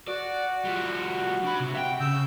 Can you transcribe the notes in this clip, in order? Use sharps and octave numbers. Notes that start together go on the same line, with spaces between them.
F#4 D5
F3 G3
D4 B5
C3
E5 G5
C#3 E6 G6